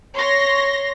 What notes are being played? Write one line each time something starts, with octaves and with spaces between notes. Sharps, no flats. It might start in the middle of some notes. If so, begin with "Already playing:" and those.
C#5 C6 A#6